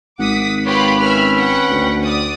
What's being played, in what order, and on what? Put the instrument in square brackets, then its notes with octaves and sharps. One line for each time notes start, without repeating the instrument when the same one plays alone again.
[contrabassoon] G#1 [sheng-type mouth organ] F#5 [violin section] D6 D#6 B6
[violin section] F4 G4 B5 [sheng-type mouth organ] B4 C#5
[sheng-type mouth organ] C#4 B4 [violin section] E5 B5 F6
[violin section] F#5 G5
[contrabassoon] D2
[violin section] D5 D#6